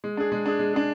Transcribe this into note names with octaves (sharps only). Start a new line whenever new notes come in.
G#3
D4 G#4
G#3
D4 G#4
G#3
D4 G#4